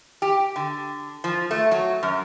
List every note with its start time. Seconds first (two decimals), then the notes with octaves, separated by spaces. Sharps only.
0.22 G4
0.56 D3
1.24 F3
1.51 A3
1.71 F#3
2.03 F#2